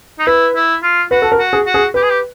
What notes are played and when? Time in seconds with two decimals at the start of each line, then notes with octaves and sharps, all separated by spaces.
0.19 D#4
0.27 E4 B4
0.55 E4
0.83 F4
1.11 F#4 B4
1.22 A4
1.32 A#4
1.39 F#4
1.53 G#4
1.66 F#4
1.74 G#4
1.94 G4 B4
2.02 G#4
2.09 G4